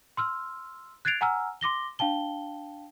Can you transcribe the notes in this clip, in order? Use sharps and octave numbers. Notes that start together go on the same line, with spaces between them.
C6 E6 F6
F#6 G#6 A6 C7 D7 F7
F#5 G#5 A#5 E6 F6
C6 D6 A#6 G7
D4 F5 G5 A5 G7